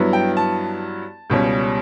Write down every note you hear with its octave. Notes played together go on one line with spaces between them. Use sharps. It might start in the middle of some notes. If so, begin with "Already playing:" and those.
Already playing: G2 F#3 B3 E4
G5
A5
C#2 B2 G3 C#4